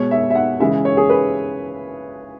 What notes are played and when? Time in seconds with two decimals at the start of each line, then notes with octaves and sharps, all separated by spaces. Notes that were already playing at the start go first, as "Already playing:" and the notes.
Already playing: B2 G#3 C#5
0.11 E5
0.30 E5
0.35 F#5
0.60 C#3 E3 G#3 E5
0.85 C#5
0.97 G#4
1.10 B4